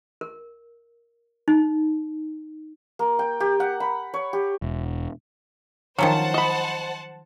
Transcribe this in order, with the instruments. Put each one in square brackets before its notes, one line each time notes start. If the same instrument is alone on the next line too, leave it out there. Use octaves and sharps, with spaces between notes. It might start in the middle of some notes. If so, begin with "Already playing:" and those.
[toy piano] A#4
D#4
[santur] A#3
G5
G4
F#5
B5
C#5
G4
[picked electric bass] E1
[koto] D#3 F3 F#3 [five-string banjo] C#4 [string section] C5 F#5 A5
[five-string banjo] D#5 B5